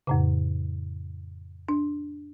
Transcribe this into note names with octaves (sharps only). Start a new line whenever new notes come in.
F2 A2 C#3
D4